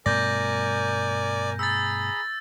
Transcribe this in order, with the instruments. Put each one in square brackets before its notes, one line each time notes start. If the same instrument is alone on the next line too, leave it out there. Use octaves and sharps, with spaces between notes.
[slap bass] G2 B2 A3 [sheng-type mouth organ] A#4 G#5 [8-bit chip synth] D5 [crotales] G6 A#6
[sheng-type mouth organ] G#4 A#5 B5 [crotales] E6 A6